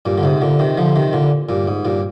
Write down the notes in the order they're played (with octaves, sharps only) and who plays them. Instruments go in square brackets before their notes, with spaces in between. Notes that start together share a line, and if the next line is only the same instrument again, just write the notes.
[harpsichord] G2 A#2
D3
G#2 C3
A#2 D3
C3 D#3
D3 F3
C3 D#3
A#2 D3
G2 A#2
G#2
G2 A#2